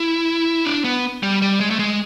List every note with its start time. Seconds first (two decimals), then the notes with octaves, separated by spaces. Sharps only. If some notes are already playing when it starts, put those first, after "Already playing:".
Already playing: E4
0.65 D4
0.84 B3
1.23 G3
1.42 G3
1.60 G#3
1.70 A3
1.79 G#3